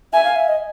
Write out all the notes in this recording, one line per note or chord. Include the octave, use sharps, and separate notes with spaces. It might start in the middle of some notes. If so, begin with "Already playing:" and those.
E5 G#5
F5
E5
D#5